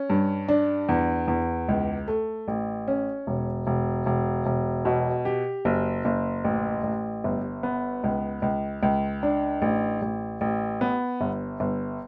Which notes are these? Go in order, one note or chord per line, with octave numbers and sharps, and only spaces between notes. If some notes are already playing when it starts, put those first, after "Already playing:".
Already playing: C#4
G2
D4
E2
E2
C#2
A3
A1
C#4
E1
E1
E1
E1
B2
G4
F#1
F#1
A1
A1
G1
B3
C#2
C#2
C#2
D4
A1
A1
A1
B3
G1
G1